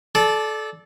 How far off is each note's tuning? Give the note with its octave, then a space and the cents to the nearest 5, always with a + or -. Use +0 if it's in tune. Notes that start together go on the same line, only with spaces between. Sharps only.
A4 -25 D5 +0